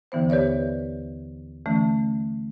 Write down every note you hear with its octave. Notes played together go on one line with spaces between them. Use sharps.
D#2 D3 E3 B3 C5
G4 B4 C#5 D5 E5
D3 E3 A3 C#4